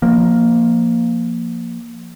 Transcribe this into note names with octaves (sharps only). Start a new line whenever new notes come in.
F3 A#3